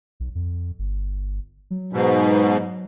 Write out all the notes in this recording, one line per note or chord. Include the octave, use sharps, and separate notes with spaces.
B1
F2
G1
F#3
G#2 B2